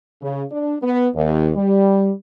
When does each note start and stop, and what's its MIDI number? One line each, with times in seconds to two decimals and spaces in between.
0.21 0.42 49
0.50 0.75 62
0.82 1.08 59
1.15 1.50 39
1.56 2.11 55